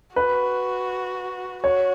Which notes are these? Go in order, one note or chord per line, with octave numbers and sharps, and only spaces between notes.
F#4 B4
F#4 C#5